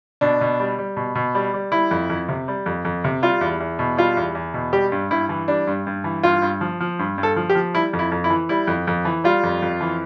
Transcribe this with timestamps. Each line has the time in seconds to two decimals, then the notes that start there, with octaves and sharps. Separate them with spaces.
0.21 B2 D4
0.41 B2
0.60 G3
0.78 G3
0.97 B2
1.15 B2
1.35 G3
1.54 G3
1.72 G3 E4
1.91 F2
2.10 F2
2.29 C3
2.48 G3
2.66 F2
2.85 F2
3.04 C3
3.22 G3 F4
3.41 E2
3.60 E2
3.79 B2
3.97 G3 F4
4.17 E2
4.35 E2
4.54 B2
4.73 G3 G4
4.92 G2
5.11 G2 E4
5.29 E3
5.48 G3 D4
5.67 G2
5.87 G2
6.04 E3
6.23 G2 F4
6.42 G2
6.61 F3
6.80 F3
6.99 G2
7.18 G2
7.23 A4
7.36 F3
7.50 G4
7.55 F3
7.74 G3 E4
7.93 F2
7.99 E4
8.12 F2
8.24 E4
8.30 E3
8.49 G3 E4
8.67 F2
8.87 F2
9.05 E3
9.24 G3 F4
9.43 F2
9.62 F2
9.81 E3